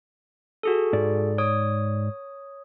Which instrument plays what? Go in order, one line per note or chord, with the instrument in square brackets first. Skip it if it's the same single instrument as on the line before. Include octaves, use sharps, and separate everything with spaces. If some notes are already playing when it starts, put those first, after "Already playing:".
[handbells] F#4 G#4 A4
[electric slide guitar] G#2 D5
[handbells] C#5 D#6